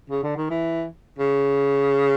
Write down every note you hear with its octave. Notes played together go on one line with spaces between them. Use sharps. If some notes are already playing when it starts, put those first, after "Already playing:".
C#3
D3
D#3
E3
C#3